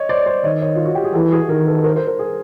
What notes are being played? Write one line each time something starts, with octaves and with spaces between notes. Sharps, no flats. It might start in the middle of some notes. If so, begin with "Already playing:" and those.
Already playing: C#5 D#5
C5 D5
C5 D5
D#3 C#5 D#5
C#5 D#5
F4
F#4
G4
G#4
E3 G4 A4
F#4 G#4
D#3 G#4 A#4
A4 B4
A#4 C5
A#4 C5
A#4 C5
G#4 A#4